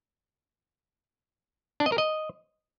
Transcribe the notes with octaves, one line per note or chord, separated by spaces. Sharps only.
D4
D#5
A#4
D#5